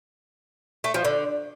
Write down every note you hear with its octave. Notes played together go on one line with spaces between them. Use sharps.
A3
F3
D3